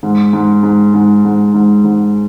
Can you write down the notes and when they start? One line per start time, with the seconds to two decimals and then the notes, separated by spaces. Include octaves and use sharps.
0.03 G#2
0.33 G#2
0.63 G#2
0.94 G#2
1.25 G#2
1.54 G#2
1.84 G#2